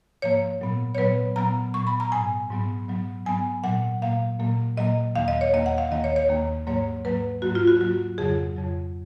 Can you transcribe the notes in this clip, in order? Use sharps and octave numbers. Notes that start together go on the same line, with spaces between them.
G#2 F3 A#3 C#5
A#2 F#3 B3
C#5
A#2 F#3 B3 B4
A#2 F#3 B3 A#5
A#2 F#3 B3 C#6
B5
A#5
G#2 F#3 B3 G#5
G#2 F#3 B3
G#2 F#3 B3
G#2 F#3 B3 G#5
A#2 F#3 A#3 F#5
A#2 F#3 A#3 F5
A#2 F#3 A#3
A#2 F#3 A#3 D#5
D#2 D#3 A#3 F5
D#5
C#5
D#2 D#3 A#3 D#5
F#5
F5
D#2 D#3 A#3 D#5
C#5
C#5
D#2 D#3 A#3
G#2 F#3 A#3 C#5
G#2 F#3 A#3 B4
G#2 F#3 A#3 F#4
F4
F#4
G#2 F#3 A#3 F#4
F2 C#3 F#3 G#4
F2 C#3 F#3